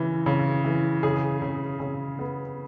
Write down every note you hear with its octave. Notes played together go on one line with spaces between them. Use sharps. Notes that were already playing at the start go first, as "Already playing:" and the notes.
Already playing: C#3 E3
C#3
E3
C#3 G#4
C#3
C#3
B3